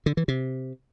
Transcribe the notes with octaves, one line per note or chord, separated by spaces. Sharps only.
D3
E3
C3